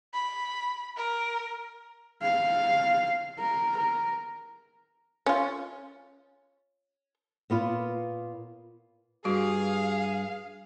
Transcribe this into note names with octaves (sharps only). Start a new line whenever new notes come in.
B5
A#4
F5
A#4
A#4
C#4 F4
A#2 B3 F4
G2 F#4 G#4 F5